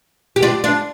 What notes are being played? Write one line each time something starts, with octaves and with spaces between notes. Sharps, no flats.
G4
D4 F4
D4 F4